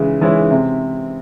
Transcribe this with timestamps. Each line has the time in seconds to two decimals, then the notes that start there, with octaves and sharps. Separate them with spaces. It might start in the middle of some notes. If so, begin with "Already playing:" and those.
Already playing: C#3 E3 G#3 C#4
0.21 E3 G#3 C#4 E4
0.51 C3